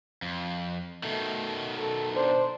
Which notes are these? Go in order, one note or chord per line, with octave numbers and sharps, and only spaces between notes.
F2
B2 D#3 A3
A4
D4 C5